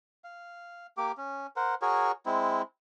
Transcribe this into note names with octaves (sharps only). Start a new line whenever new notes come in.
F5
A#3 G4 D6
C#4
A#4 C5 F#5
F#4 G#4 A#4 C#5
G#3 C4 E4